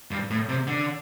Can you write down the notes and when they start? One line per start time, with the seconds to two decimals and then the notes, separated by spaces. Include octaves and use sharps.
0.11 G2
0.30 A2
0.49 C3
0.67 D3